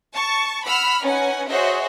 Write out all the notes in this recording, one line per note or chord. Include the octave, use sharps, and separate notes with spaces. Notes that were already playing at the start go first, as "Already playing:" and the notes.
A5 C#6
F#5 B5 E6 F6
C#4 D#4 B4 F#5 G#5
F#4 G#4 C5 C#5 D#5 E5